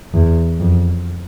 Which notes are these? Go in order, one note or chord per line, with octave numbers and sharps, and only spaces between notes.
E2
F2